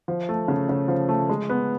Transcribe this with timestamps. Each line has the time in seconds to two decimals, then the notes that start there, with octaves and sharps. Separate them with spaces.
0.08 F3
0.29 A3
0.48 C#3
0.69 C#3
0.88 F3
1.09 A3
1.29 G#3
1.49 B3